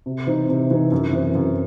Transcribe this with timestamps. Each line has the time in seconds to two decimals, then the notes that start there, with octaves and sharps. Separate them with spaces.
0.06 C3
0.27 E3 C4 D#4
0.49 C3
0.71 E3 C4 D#4
0.92 F#2
1.13 E3 C4
1.35 F#2